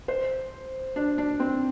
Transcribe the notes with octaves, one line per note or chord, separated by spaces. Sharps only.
C5
D4
D4
C4